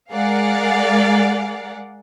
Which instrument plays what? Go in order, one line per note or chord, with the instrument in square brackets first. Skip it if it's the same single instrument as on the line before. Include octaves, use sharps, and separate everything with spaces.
[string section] G#3 G#4 A#4 D5 F5 F#5